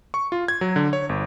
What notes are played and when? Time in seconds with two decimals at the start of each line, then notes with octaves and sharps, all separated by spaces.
0.14 C#6
0.32 F4
0.48 G#6
0.61 F#3
0.76 D3
0.93 C#5
1.09 G1